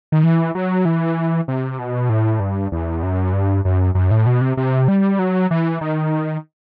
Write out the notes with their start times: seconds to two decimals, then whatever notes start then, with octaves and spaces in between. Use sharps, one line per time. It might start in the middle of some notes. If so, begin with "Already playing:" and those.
0.12 D#3
0.23 E3
0.55 F#3
0.85 E3
1.48 C3
1.79 B2
2.09 A2
2.40 G2
2.72 E2
3.03 F#2
3.33 G2
3.65 F#2
3.95 F#2
4.11 A2
4.26 B2
4.41 C3
4.57 C3
4.88 G3
5.19 F#3
5.51 E3
5.81 D#3